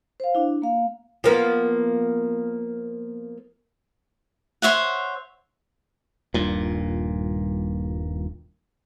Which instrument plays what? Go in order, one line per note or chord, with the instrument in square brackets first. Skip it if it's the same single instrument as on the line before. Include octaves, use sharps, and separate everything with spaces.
[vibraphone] C5 F5
D4 E4
A#3 F5
[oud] F3 A#3 B3
[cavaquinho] C5 C#5 E5 F#5
[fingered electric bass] D#1 G2 A#2